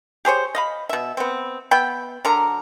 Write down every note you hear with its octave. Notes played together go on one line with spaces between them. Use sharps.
G4 G#4 C5 C#5
D#5 F5 B5
B2 E5
B3 C4
B3 E5 G5 B5
D3 F#3 A#4 A#5